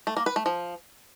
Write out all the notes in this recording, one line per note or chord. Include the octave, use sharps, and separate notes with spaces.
A3
A#3
B4
A3
F3